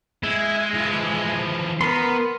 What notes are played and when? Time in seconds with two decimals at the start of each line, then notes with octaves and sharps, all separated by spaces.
0.24 G#3 E4
0.74 E3 F3
1.81 B3 A#4 B5 C6